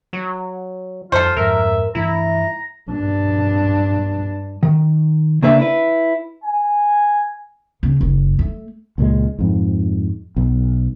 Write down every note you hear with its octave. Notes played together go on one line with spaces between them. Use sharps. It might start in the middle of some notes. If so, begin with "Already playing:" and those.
F#3
F2 G3 F4 A4 C5
F2 G#2 F3 A#4 E5
G2 E3 A3 E4 A#5
G2 D4
D#3
C#3 A#3 D4 B4 E5
E4 B4
G#5
C#3
F#1
A3
C#2 A#2 F#3 G#3
F2 G#2
B1